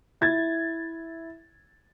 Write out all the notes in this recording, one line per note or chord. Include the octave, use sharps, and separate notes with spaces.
E4 G#6 A6